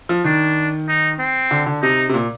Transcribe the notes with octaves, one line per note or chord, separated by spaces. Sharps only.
F3
D#3 D4
D#4
C4
D3
D3
C3 D#4
C3
A#2